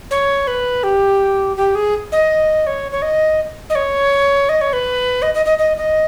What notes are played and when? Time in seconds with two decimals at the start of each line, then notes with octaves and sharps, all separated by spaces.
0.11 C#5
0.47 B4
0.83 G4
1.57 G4
1.75 G#4
2.12 D#5
2.67 C#5
2.92 C#5
3.02 D#5
3.70 D#5
3.75 C#5
4.49 D#5
4.61 C#5
4.73 B4
5.22 D#5
5.34 D#5
5.46 D#5
5.58 D#5
5.77 D#5